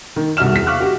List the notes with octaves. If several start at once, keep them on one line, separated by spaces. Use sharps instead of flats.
D#3
C2 F#4 E5 F6 E7
E2 B6
F5 C#6 D6 F6 F#6
F#4 G4